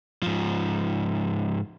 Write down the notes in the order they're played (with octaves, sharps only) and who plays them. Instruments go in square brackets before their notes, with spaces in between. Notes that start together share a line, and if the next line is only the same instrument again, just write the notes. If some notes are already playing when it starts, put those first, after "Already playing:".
[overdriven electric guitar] G#2 F3